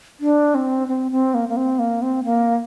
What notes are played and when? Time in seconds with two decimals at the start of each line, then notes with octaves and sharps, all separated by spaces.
0.20 D4
0.55 C4
0.88 C4
1.11 C4
1.34 A#3
1.49 A#3
1.57 C4
1.79 A#3
2.02 C4
2.24 A#3